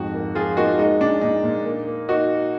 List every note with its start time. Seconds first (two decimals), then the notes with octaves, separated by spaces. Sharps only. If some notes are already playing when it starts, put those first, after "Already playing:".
Already playing: F2 G#2 F#4
0.14 A#3
0.35 F3 F4 G#4
0.57 A#3 D#4 F#4
0.79 G#3 D#4
1.00 A#2 D4
1.21 A#2 D#4
1.43 A#2
1.65 A#3
1.87 A#3
2.09 A#3 D#4 F#4